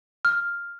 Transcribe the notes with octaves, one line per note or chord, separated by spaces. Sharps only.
F6